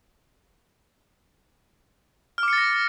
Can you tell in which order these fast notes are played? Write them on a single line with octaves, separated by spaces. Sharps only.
F6 D6 C#7 A6 A#6